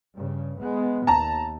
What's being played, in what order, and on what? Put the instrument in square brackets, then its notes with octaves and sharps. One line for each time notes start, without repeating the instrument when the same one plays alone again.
[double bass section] G2 C#3
G#3 B3
[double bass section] D#2 [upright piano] A5 A#5